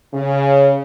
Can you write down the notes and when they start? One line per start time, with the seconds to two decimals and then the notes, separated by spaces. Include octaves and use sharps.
0.14 C#3